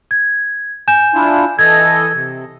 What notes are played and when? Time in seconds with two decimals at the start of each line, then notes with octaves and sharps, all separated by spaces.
0.11 G#6
0.88 G#5 G6 E7
1.14 D4 E4 F4
1.59 E3 A4 D#5 G#6
2.14 C3